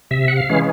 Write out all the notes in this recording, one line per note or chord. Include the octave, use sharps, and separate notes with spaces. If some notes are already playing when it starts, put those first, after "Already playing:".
C3 E5
F#5
F5
E3 G#3 C#4